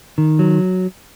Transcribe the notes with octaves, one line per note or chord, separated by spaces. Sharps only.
D#3
F#3